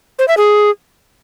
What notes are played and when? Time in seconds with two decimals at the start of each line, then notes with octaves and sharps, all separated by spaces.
0.19 C5
0.28 E5
0.37 G#4